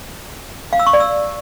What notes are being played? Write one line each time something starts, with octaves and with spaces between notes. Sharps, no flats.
F5
E6
C#6
D5
E6